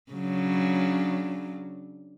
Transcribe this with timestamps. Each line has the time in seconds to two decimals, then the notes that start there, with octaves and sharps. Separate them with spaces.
0.12 C#3 F#3 D4